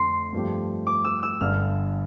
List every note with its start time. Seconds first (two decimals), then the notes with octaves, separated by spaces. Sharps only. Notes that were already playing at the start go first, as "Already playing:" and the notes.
Already playing: F2 D3 A3 C6
0.33 G2 F3 A3 C4 G4
0.87 D6
1.04 E6
1.23 E6
1.41 G1 G2 D3 F6